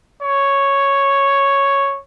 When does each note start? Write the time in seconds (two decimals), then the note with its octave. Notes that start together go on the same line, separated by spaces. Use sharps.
0.23 C#5